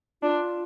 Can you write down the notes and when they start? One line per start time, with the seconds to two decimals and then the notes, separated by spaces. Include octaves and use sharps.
0.22 D4 F4